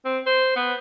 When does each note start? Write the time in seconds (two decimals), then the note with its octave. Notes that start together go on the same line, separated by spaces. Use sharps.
0.05 C4
0.26 C5
0.56 B3